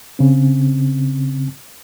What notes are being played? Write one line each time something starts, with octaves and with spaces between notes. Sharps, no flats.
C#3 C4